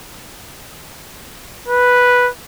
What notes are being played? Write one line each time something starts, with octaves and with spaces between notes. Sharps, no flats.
B4